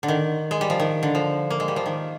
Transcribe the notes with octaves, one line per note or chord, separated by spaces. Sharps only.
D3
D#3
G#3
G3
F3
D#3
D3
F3
A#3
G#3
G3
F3
D#3